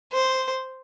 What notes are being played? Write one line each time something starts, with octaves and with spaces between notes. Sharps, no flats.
C5